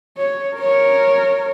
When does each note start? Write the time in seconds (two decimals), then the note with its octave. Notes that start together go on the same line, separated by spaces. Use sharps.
0.17 C#5
0.56 A#4 C#5